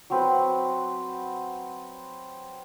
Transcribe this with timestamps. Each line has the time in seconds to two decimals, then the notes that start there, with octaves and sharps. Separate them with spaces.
0.10 F#3 C4 B4